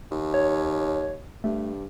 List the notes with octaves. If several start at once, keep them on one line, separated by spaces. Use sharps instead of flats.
D#2
C#5
G2 A3